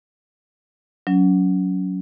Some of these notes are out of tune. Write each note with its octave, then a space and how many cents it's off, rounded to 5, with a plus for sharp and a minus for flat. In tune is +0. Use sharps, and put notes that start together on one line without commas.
F#3 +0 C#4 +25